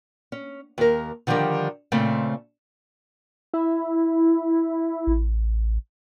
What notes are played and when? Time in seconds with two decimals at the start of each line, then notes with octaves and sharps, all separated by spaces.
0.32 C#4
0.78 D#2 A#4
1.27 D3 D#3 F3 G3 G4 A#4
1.92 A#2 C#3 A3 C4
3.54 E4
5.07 A1